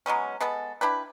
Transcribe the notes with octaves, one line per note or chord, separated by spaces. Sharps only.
F#3 G#3 B3 C#4
G#3 B3 A4
D4 E4 G4 B4